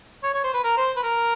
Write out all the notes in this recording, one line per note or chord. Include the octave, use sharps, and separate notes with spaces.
C#5
C#5
C5
B4
A#4
C5
B4
A#4